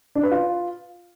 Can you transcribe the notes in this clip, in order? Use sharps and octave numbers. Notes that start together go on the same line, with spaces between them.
D4
B4
F4